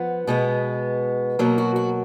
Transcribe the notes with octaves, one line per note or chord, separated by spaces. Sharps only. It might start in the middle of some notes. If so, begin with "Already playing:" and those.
Already playing: F3 B3 F#5
B2 G#3 B3
B2 F#3 A#3
F#4
F#4